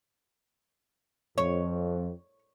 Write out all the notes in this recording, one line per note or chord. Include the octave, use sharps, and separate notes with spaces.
F2 C#5